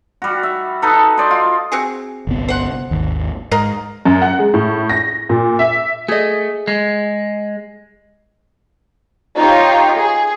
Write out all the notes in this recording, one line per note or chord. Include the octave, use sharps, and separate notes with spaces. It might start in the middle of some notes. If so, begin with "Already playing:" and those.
G3 F#4
E5
D#4 A4 B4
C5 D5 D#5
F4
C4 F#4 G#4
G1 C2 B3
C5 F#5
G#1 D#2
G#2 A#4 D#5 F5
F#2
F#5
G#3
A2
A#6
A#2
E5
A3 G#4 D#5
G#3
D#4 F4 G4 C#5
G#4